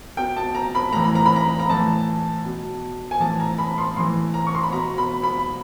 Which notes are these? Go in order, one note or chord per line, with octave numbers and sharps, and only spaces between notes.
B2 G5
A5
A#5
B5
A2 E3 A#5
B5
A#5
B5
A#5
A#5
A2 E3 A5
B2
G#5
A2 E3 A5
A#5
B5
C6
A2 E3 C6
A#5
C#6
C6
B5
B2 A#5
B5
B5